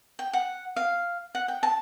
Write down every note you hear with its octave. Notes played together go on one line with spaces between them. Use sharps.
G5
F#5
F5
F#5
G5
A5